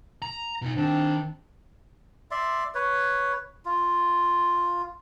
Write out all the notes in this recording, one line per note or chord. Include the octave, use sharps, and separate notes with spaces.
A#5
B2 D#4
D#3 C4 D4
D5 E5 C6
B4 C#5
F4